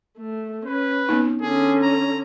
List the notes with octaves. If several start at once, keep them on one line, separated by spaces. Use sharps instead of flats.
A3
C#4 B4
B3 C4 D#4
D3 C#4 G#4
A#5